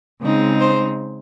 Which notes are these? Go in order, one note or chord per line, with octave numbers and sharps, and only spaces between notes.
C#3 G#3 C4 D#4
C5